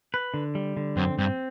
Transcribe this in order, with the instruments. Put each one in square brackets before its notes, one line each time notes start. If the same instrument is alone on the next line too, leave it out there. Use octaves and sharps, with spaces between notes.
[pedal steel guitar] B4
D3
G3
D3
[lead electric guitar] F#2 [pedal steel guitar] C4
[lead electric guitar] G2 [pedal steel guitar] C4